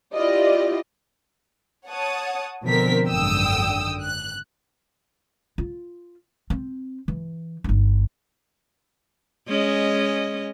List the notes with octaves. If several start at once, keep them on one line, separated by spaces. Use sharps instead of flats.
E4 F4 G4 D5 D#5
C#5 F#5 A5 D#6
B2 D3 F3 C4 A#4 B6
G#1 F#2 D3 G5 D#6 E6
F#6
F4
C4
E3
G1 D#4
G#3 C#4 D#5